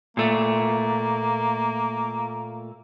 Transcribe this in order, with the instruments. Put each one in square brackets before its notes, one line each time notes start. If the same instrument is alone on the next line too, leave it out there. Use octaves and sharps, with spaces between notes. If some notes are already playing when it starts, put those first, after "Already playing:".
[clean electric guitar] A#2 A3 [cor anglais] A#3